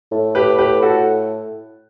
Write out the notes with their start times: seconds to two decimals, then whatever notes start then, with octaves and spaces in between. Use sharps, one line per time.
0.11 A2
0.35 G4 B4
0.58 G4 B4
0.82 F#4 A4